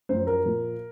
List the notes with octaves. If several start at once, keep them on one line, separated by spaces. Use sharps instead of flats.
F#2 C5
F3
A#4
A#2 F3